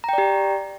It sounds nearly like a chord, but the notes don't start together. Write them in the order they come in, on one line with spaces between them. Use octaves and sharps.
A#5 G5 D5 G4